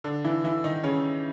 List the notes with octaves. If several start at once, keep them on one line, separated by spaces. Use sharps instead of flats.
D3 D4
E3 E4
E3 E4
D#3 D#4
C#3 C#4